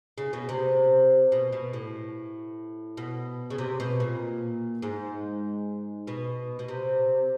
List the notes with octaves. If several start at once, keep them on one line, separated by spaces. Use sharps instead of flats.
C#3
B2
C3
B2
B2
A2
B2
C#3
C3
B2
A#2
G#2
B2
B2
C3